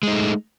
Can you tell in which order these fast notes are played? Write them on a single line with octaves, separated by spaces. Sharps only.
G#3 D#4 A3